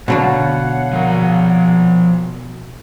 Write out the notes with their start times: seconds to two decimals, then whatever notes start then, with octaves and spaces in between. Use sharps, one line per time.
0.08 B2 D3 F#3 D4 C#5 F5 F#5
0.93 F3 A#4